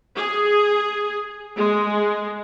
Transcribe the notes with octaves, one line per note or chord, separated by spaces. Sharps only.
G#4
G#3